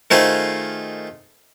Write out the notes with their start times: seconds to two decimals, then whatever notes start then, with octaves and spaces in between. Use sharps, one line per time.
0.11 D#3 A3 D#4 F4 G#4 C5